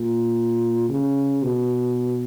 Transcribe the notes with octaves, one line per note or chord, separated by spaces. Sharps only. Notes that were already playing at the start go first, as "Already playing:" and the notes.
Already playing: A#2
C#3
B2